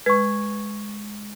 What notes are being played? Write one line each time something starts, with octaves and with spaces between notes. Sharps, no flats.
G#3 B4 C#6 G#6